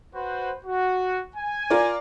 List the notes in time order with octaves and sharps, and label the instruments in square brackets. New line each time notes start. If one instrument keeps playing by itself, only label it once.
[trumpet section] F#4 B4 C5
F#4
G#5
[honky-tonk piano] F4 A#4 D5